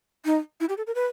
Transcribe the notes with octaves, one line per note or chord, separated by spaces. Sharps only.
D#4
E4
G4
A4
A#4
B4